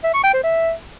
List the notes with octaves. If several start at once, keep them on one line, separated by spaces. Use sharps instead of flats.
E5
C#6
G5
C5
E5